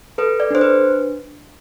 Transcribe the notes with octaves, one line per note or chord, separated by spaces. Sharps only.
A4 B4
D5
D4 C5
B4